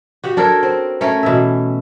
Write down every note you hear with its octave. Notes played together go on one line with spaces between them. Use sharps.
F#4 G4 F#5
D4 A4 A#4 C#5
C4
A3 C#4 A#4 C#5
B2 E3 E5